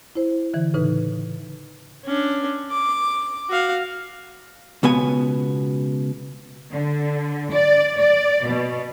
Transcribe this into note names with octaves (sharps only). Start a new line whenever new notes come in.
E4 C5
D3 E3
A2 C#3 D#4 B4
C#4 D4
D6
F#4 F5
C#2 B2 B3 G#5
D3
D5
D5
B2